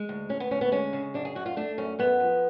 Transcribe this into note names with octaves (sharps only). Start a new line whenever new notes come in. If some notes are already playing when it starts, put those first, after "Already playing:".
Already playing: G#3
D2
D2 C#4
B3
D2 C#4
B3
G#3 C#4
C#3
F#2 D4
G#4
F#2 F#4
F4
A3 D4
F#2 C#4
F#2 B3
F3